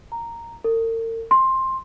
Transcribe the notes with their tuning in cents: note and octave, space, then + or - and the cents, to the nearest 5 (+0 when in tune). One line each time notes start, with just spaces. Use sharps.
A#5 -5
A#4 -45
C6 +10